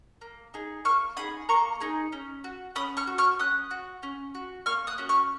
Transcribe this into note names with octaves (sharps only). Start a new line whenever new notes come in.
A#3
D#4 G#4
A#3 C#6 F6
D#4 G#4 B5 D#6
A#3 A#5 C#6
D#4 G#4
C#4
F#4
C#4 B5 D#6
C#6 F6
F#4
C#6 F6
C#4 D#6 F#6
F#4
C#4
F#4
A#3 C#6 F6
D#6 F#6
C#4 F#4
C#6 F6